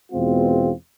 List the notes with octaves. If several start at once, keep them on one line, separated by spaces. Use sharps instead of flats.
E2 B2 G#3 C4 F4